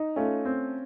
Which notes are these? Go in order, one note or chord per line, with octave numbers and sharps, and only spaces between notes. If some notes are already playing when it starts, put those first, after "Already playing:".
Already playing: D#4
A3 C#4 F4
C4